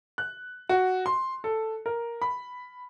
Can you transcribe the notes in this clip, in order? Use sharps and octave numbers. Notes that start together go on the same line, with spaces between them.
F#6
F#4
C6
A4
A#4
B5